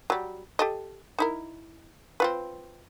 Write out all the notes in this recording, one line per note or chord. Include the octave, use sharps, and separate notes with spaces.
F#3 G3
G4 A4 D#5
D#4 E4 A#4
C4 F4 B4